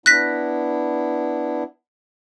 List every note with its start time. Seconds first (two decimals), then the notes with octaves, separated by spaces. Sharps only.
0.06 B3 D4 E4 F#6 A#6 B6